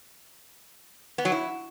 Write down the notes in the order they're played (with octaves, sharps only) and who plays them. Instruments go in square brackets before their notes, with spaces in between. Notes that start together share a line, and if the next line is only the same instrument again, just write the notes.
[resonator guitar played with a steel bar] B3
F#3
E4